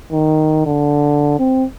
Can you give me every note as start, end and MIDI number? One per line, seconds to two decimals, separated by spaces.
0.12 0.64 51
0.66 1.38 50
1.39 1.64 60